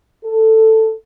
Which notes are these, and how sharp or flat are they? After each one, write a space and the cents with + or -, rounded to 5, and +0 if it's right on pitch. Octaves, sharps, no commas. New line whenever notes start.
A4 +10